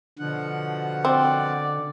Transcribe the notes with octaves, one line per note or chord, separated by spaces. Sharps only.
B2 D3 F3 F#5
C4 D5